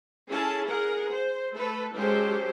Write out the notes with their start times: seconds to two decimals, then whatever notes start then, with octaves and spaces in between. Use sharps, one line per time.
0.27 C#4 E4 G#4 A4 A5
0.66 G#4 A#4 F#5
1.09 C5
1.53 A3 A4 B4
1.94 F#3 G#3 C#4 G4 A4 C5